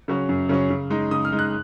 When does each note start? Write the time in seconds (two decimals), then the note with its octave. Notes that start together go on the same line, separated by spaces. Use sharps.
0.08 C#3 F#3 C#4
0.29 F#2
0.49 C#3 F#3 C#4
0.70 C#3
0.90 G#3 D#4
1.11 C#3 D#6
1.25 F6
1.32 G#3 D#4
1.39 F#6